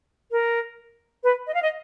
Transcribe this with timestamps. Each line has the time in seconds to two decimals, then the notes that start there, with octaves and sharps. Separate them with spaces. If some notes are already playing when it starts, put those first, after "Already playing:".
0.31 A#4
1.23 B4
1.46 D#5
1.54 F5
1.62 D#5